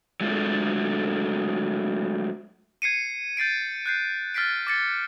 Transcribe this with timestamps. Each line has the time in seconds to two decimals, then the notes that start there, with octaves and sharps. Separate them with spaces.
0.21 F#3 G#3 A3 D4 F4 A4
2.82 G#6 C7 C#7 D#7
3.37 G6 A6 C7 D7
3.86 F#6 G6 C7
4.34 F6 A6 B6 C7 D7
4.67 D6 A6 C#7